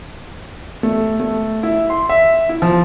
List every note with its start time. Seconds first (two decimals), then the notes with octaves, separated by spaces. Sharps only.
0.83 A3
1.20 A3
1.63 E4
1.90 C6
2.09 E5
2.49 E4
2.62 F3